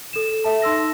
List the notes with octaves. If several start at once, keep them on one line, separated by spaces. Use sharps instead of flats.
A4 E7
A4 E5 A5
D#4 C6 E6 A#6